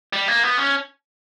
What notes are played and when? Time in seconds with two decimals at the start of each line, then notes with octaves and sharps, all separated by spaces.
0.13 G3
0.28 A#3
0.43 B3
0.58 C#4